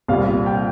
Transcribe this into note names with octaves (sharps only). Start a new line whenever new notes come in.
C2 A#2 G3 F5
G5